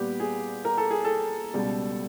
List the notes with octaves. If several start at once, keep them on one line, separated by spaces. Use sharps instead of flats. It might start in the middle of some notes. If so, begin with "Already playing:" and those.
Already playing: A#2 G3 B3 G4
G#4
A#4
A4
G#4
A4
C#2 B2 G3